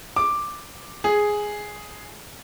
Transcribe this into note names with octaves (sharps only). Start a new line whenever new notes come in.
D6
G#4